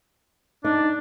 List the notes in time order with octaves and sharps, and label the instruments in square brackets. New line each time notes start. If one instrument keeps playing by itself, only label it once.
[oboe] D4 [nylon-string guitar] D#4